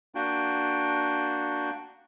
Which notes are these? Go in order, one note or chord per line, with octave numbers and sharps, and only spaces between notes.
A#3 D4 F#4 G5